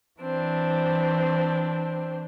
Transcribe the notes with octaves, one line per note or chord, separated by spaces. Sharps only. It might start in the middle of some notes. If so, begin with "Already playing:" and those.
E3 C4 D4